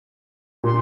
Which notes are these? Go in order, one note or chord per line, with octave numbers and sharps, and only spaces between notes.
A#2 C6